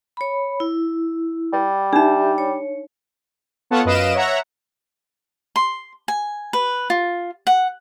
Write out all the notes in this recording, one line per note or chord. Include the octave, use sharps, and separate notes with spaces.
C#5 B5
E4
G3
D4 D#4 G4 E5
C#5
B3 F4 A4 C#5 F#5 A5
F#2 B4 D#5 F5 D7 E7
C#5 E5 F#5 A#5
C6
G#5
B4
F4
F#5